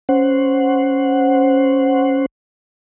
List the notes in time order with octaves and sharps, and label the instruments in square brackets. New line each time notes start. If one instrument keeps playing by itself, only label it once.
[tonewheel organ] C#4 C5 F#5